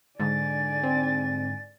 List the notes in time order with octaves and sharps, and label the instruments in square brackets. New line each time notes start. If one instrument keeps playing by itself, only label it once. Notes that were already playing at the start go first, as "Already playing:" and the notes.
[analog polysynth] G#2 D3 [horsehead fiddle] D5 G#5 [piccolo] A6
[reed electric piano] C4